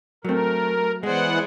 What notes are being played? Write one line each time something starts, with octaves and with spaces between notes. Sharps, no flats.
F#3 A3 C4 A#4
E3 G#3 B3 G#4 C5 D5 F#5